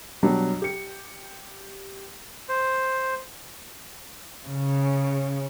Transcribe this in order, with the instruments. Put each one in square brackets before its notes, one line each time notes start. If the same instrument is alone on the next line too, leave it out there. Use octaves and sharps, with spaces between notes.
[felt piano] B2 F#3 G3 D4
G4 C#7
[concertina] C5
[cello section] C#3